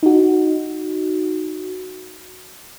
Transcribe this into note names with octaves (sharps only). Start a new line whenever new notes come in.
D#4 F#4